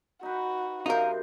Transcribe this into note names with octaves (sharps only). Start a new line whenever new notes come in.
D#4 F#4 B4
F#2 C3 D#4 A#4 C5 F5